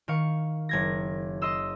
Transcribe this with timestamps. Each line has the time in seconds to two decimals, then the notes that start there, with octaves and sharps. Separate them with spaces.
0.08 D#3 F5 C#6
0.69 F#1 G#6 A#6
1.42 D#5 C6 E6